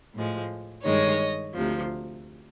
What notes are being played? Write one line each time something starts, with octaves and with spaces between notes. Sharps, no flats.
A2 F3 G#3
G2 D#3 G#3 C#5 D#5
D2 C3 F3